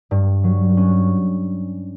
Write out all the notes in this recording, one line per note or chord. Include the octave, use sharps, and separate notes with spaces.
G2
F#3
C#4